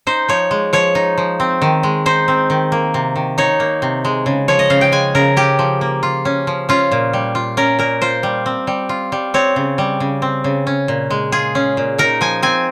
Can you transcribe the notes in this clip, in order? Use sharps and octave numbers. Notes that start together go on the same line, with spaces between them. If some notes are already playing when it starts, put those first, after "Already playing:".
D#4 C5
F3 C#5
G#3
F3 C#5
D#4
F3
C4
D#3
G#3
D#4 C5
C4
D#3
A#3
C3
D#3
D#4 C#5
A#3
C3
G#3
C#3
F3 C#5
D#5
C#3 F5
G5
G#3 G#5
C#3 A#4
C#4 G4
F3
A#3
F4
C#4
F3
C#4 F4
A#2
G3
F4
C#4 A#4
A#2 A#4
F4 C5
G3
C4
G3
F4
G3
C4 C#5
C#3
G3
C#3
C4
C#3
C#4
A#2
G#3
F4 G#4
C#4
A#2
D#4 A#4
F3 G#5
C4 G#5